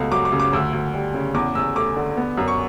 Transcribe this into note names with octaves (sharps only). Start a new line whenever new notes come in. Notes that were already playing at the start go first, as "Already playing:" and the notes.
Already playing: C#2 B2 A3
F#3 D6
D6
C#3
D6
D2 E6
D2
G3
C#3
E2 D6
E2 E6
A3 D6
D3
B3
F#2
C#6